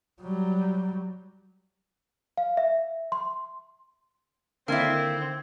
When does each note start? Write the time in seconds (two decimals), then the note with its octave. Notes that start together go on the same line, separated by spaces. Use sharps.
0.22 F#3 G3
2.37 F5
2.57 E5
3.12 C6
4.68 D3 D#3 A#3 C4 E4 E6 G#6